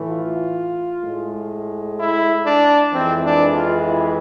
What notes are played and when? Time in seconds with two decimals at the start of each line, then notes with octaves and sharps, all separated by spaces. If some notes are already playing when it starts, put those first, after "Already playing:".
Already playing: A2 E3 A3
0.09 F4
1.04 A2 G#3
1.99 E4
2.46 D4
2.93 F2 E3 G#3 C4
3.25 D4
3.56 F4
3.88 E4